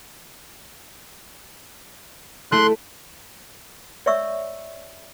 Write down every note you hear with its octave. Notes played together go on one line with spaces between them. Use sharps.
A3 E4 C6 F#6
C#5 D5 E5 C#6 E6